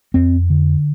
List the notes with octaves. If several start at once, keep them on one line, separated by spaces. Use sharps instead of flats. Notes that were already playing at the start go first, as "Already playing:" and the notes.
F2 C4
D3